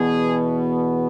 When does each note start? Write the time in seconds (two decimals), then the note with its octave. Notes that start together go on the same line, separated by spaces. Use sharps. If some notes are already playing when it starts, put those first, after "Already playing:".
Already playing: E2 B2 B3 G#4